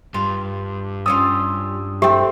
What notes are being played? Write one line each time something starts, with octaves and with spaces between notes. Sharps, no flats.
G2 F4
G3 C#4 F4 D#6 E6
A3 C4 G4 E5 G5